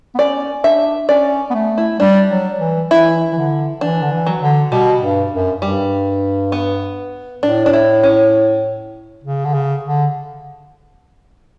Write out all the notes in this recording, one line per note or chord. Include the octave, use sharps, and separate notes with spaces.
B3
C#4 D5
D4 E5
C#4 D5
B3
A3
E4
G3 D4
F#3
E3
E3 E4
E3
D3
E3 D4
D3
E3
F#3
D3
B2 G3
G2
F#2
G2 G3
B3
A2 D4
D4
E4
C#4
C#3
D3
C#3
D3